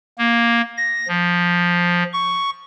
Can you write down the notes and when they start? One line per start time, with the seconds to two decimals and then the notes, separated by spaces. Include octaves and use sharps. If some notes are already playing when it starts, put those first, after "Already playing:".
0.19 A#3
0.77 A#6
1.08 F3
2.13 C#6